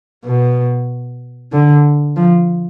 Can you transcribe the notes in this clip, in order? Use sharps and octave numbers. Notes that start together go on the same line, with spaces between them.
B2
D3
F3